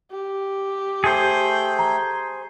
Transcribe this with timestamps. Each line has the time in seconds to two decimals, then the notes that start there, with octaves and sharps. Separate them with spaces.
0.11 G4
1.04 A3 G#4 C5 G5
1.79 A#5